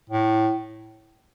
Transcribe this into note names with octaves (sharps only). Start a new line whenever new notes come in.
A2